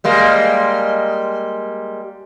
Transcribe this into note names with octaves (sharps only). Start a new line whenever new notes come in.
G3 G#3 A#3